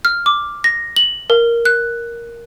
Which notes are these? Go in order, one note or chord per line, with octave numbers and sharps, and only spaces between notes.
F6
D6
A#6
F#7
A#4
F#6